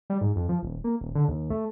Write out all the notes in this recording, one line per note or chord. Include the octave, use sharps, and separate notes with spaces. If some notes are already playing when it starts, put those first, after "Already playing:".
G3
G#2
F2
F3
D#1
A#3
D#1
D3
D#2
A3